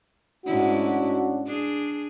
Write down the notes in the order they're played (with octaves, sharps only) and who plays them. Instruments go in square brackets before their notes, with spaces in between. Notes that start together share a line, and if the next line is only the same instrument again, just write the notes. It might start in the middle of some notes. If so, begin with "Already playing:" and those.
[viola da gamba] G#2 A3 E4 [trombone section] C#4 D4 F#4
[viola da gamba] D4 G#4